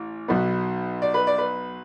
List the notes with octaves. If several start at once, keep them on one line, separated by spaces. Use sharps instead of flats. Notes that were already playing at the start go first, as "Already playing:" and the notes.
Already playing: A1
B1 B2 B3
D5
B4
D5
B4